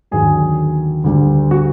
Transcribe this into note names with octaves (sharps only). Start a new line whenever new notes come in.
D#2 D3 F#3 G#4
D2 D3 G3
F#4